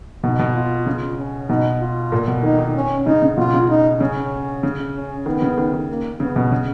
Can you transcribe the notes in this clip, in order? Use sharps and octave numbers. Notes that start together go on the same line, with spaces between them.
B2 D#4
B2
F4
C#3 F4
C#4
B2 D#4
F4
A#2
B2
D#3 D#4
D#3
C#4
C#3 D#4
C#3
B2 F4
C#3
D#4
C#3 C#4
C#3
C#4
D#3 B3
C#3
D#3
D#3
A#3
C#3 B3
B2
C#3